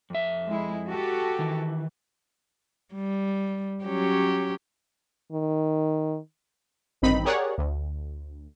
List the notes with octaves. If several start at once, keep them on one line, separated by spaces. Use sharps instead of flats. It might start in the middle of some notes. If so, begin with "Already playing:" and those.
F2 E5
G#3 E4
F#4 G4 A4
D#3 E3
G3
F#3 C#4 G4
D#3
A1 G2 D#3 C4 D#4 B5
G4 G#4 A#4 C#5 D5 F#5
D2